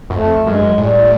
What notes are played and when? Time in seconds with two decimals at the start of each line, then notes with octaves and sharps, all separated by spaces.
0.10 F#2
0.15 F2 A3
0.46 F#2 G#3
0.54 G2
0.61 F#2
0.78 A2 G3